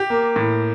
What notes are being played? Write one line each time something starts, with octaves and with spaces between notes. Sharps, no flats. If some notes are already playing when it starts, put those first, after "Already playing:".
Already playing: G4
A#3
A2